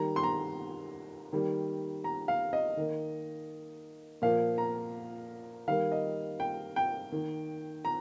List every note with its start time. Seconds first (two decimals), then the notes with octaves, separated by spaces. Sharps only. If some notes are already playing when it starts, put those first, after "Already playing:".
Already playing: D#3 G3 A#3 A#5
0.16 C6
0.23 A#5
1.33 D#3 G3 A#3
2.04 A#5
2.28 F5
2.53 D#5
2.77 D#3 A#3
4.22 A#2 F3 A#3 F5
4.58 A#5
5.68 D#3 G3 A#3 F5
5.92 D#5
6.40 G5
6.76 G5
7.12 D#3 A#3
7.85 A#5